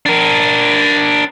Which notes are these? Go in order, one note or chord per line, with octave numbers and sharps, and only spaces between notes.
D4 A#4